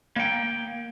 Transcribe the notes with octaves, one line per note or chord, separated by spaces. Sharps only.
A#3 G5